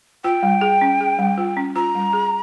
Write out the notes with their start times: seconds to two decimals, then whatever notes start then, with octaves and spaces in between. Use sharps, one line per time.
0.24 F4 G5
0.43 G3
0.61 G#4
0.81 C#4
1.00 G#4
1.19 G3
1.38 F4
1.57 C#4
1.76 F4 A#5
1.95 G3
2.13 G#4